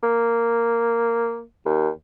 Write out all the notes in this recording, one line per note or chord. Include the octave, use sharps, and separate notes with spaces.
A#3
D#2